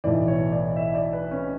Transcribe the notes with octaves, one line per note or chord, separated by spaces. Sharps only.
B1 A2 E3 D5
C#5
D5
E5
D5
B4
C#4